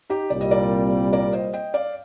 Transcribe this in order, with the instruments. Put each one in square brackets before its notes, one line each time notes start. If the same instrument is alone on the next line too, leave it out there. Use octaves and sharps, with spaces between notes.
[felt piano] D#4 G4
[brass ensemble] C2 A#2 G3 C4 [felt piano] D5
[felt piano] D#5
A#4 D5
A#4 D5
C5 D#5
D#5 G5
D5 F5